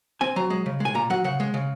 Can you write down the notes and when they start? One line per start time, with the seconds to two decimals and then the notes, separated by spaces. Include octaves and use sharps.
0.21 C4 G#5
0.36 F#3 A#5
0.50 G#3
0.66 C#3
0.80 G#3 G#5
0.95 A#2 A#5
1.10 F#3 F#5
1.24 C#3 F#5
1.40 G#3
1.54 C#3